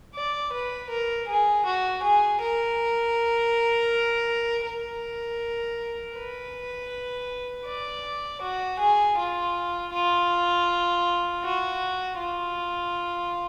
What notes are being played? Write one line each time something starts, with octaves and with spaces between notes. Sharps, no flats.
D5
B4
A#4
G#4
F#4
G#4
A#4
A#4
B4
D5
F#4
G#4
F4
F4
F#4
F4